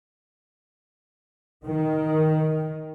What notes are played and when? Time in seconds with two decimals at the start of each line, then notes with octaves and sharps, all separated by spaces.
1.65 D#3